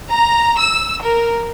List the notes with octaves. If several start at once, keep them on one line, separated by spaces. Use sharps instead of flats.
A#5
E6
A#4